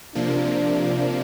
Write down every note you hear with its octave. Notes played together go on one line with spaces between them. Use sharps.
C3 F3 A#3 D4